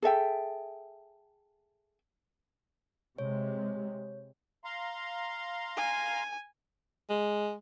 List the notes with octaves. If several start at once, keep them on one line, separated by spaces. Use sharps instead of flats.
G#4 A4 E5 G5
C3 G#3 C#5
F5 A#5 C6
G#5
G#3